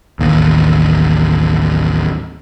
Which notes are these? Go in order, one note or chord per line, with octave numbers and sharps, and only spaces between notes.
A1 D#2